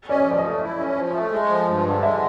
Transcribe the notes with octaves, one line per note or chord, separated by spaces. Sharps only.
C#4 D5
D#5
F3
D5
D#5
A3
E4
C#4
F3
A3
G#3
F3
G2
D3
G#3 E5